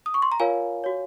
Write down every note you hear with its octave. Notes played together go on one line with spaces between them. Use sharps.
D#6
C#6
C6
A#5
F4 A#4 C#5 F5 G#5
F#4 C#5